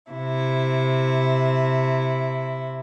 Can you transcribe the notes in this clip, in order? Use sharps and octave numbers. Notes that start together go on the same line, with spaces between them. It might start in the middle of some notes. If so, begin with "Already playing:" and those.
C3 E4